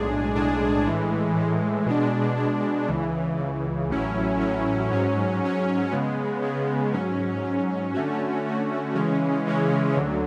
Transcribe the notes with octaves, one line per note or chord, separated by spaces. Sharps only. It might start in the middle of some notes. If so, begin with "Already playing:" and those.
Already playing: B1 A2 G#3 D4 G#4
B1 A2 G#3 D4 G#4
A2 E3 G#3
A2 E3 G#3
B2 G#3 D4
B2 G#3 D4
C#2 C#3 E3
C#2 C#3 E3
A1 A2 F#3 C#4 E4
A1 A2 F#3 C#4 E4
G#2 F#3 C#4
G#2 F#3 C#4
C#3 G#3 B3
C#3 G#3 B3
G#2 F#3 C#4
G#2 F#3 C#4
D3 A3 C#4 F#4
D3 A3 C#4 F#4
C#3 E3 G#3 C#4
C#3 E3 G#3 C#4
D2 D3 F#3